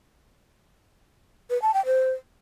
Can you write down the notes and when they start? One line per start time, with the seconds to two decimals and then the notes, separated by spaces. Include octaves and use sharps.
1.50 B4
1.62 A5
1.74 G5
1.86 C5